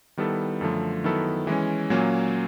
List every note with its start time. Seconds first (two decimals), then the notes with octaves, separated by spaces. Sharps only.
0.17 D#3 G3 B3 E4 A4
0.61 F#2 D3 F3 A3
1.04 D#3 F#3 B3 E4 A4
1.47 E3 G#3 C#4
1.90 A#2 F#3 A#3 C#4